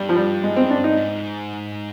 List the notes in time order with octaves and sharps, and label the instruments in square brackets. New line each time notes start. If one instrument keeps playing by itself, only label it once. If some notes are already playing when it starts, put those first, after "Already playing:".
Already playing: [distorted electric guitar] G2 [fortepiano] G3
[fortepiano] F3
G3
G#3
C4
D4
D#4
[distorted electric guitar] G#2